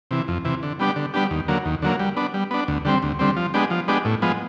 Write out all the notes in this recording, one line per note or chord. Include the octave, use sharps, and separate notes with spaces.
C3 E3
F2
C3 E3
D3
G3 B3 D4 G4
D3
G3 B3 D4 G4
D#2
D3 F#3 A#3
D#2
D3 F#3 A#3
G3
B3 D4
G3
B3 D4
D2
D3 G3 C4
D2
D3 G3 C4
F3
G#3 B3 D4 G4
F3
G#3 B3 D4 G4
A2
F3 G#3 B3